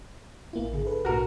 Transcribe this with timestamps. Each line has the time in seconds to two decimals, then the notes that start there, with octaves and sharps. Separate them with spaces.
0.53 A1 A#3 E4
0.72 G#1 D3 G#4
0.86 A4 B4
1.05 B1 A2 F#4 A#4